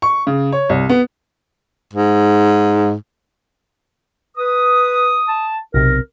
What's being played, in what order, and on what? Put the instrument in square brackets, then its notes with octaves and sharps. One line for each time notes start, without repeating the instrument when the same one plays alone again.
[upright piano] C#6
C#3
C#5
C2
B3
[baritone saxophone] G#2
[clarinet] B4 [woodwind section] D#6
[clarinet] A5
[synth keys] B1 C3 [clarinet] A#4